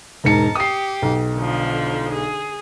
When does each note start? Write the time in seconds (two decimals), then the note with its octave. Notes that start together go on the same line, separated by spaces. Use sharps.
0.24 E1 G#2 A#4 A5 C#7
0.55 G4 D#6 C7
1.02 B1
1.34 D3 F3
2.13 G#4